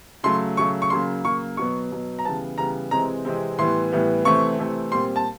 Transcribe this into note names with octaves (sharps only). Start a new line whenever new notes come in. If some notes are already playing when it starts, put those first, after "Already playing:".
C#3 F#3 A3 C6
C#3 F#3 A3 C#6
C#6
C#3 F#3 A#3 C6
C#3 F#3 A#3 C#6
B2 F#3 B3 C#6
B2 F#3 B3
A#5
C#3 E3 G3 B3 A5
C#3 E3 G3 B3 A#5
C3 E3 G#3 C4 A#5
C3 E3 G#3 C4
A2 E3 G3 B3 C6
A2 E3 G3 B3
C3 E3 A3 C4 C#6
C3 E3 A3 C4
A#2 G3 C4 C6
A5